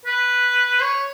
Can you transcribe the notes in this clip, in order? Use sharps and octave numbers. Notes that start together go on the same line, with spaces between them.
B4
C#5